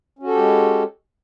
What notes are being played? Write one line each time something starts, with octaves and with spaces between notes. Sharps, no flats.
G#3 C#4 F#4 G4 A4